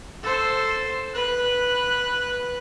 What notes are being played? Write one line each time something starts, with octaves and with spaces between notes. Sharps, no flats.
A4 C5
B4 F#6